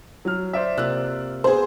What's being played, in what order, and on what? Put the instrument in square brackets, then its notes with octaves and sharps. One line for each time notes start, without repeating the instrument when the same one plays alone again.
[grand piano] F#3 F6
C5 D5 E5
[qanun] C3 A#3 F4 [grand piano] D5 E6 F#6
[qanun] B3 [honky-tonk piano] G#4 C5